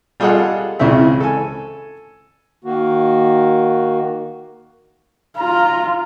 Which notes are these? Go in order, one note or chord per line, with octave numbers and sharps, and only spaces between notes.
G3 F4 G#4 A4 D#5 F#5
C#2 C#3 E3 C4 E5
A4 G#5
D#3 A#3 F#4
F4 A#5